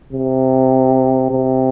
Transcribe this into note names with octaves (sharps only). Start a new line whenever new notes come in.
C3
C3